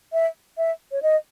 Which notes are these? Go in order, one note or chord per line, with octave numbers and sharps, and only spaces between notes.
E5
E5
C#5
D#5